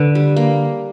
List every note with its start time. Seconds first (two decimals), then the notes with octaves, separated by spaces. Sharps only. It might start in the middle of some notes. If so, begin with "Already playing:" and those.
Already playing: D3 B4
0.15 G3
0.36 A#3